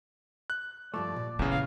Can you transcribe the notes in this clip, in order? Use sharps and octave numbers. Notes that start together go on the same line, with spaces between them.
F#6
G2 F3 A3 D5
A#2
E2 C#3 A3
F5